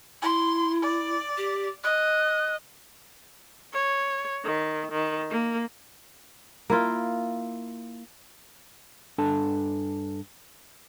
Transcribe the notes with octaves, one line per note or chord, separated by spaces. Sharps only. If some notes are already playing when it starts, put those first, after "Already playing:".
E4 C6
D5
G4
D#5 F#6
C#5
D#3
D#3
A#3
A#3 E4 F4
G2 D4 A4 A5